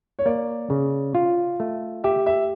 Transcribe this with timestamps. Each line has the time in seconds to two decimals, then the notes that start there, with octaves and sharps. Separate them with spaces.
0.19 C#5
0.26 A#3 D5
0.70 C#3
1.15 F4
1.60 A3
2.04 G4 E5
2.26 E5